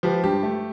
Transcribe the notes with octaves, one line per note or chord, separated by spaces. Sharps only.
F3 G4 B4
G2 G4
A3